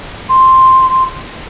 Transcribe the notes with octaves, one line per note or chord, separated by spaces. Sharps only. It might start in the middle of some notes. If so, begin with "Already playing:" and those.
C6